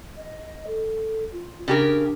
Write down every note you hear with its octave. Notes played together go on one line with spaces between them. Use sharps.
D#5
A4
F4
C#3 D4 G4 A#4